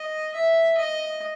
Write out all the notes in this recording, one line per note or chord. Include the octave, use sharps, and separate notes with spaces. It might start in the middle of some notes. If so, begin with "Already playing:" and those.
Already playing: D#5
E5
D#5